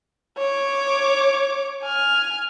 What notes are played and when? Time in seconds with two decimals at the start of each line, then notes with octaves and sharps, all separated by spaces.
0.38 C#5 D6
1.83 G#5 F6